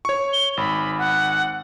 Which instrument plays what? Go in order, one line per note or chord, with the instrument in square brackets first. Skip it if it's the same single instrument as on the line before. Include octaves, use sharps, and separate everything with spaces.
[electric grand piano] C#5 C#6
[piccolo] G7
[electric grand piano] G#1 [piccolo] B5
[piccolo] F#5